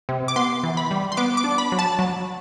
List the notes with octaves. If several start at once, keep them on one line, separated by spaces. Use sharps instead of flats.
C3
D6
B3 C6
E3
B5
G3
C6
B3 D6
D6
D4
B5
F#3
A5
F#3